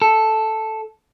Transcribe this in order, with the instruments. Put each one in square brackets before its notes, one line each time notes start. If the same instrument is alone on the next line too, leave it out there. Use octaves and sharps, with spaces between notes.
[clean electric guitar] A4